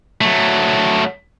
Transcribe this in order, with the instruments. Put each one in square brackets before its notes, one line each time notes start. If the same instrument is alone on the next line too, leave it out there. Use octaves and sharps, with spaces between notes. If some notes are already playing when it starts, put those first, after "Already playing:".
[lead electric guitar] F#3 A3